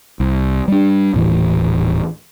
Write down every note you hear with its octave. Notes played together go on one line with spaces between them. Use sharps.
C2
G3 D4
D#1 A2 E3